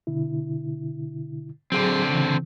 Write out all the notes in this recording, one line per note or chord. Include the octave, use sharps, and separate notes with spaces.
B2 D3 E4
D3 F#3 C4 G#4
C#3 E3